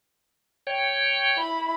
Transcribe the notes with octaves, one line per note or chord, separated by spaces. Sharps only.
C#5 G5
E4 B5